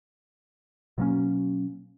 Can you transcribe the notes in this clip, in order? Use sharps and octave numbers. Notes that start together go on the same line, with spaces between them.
B2 F#3 A#3 C#4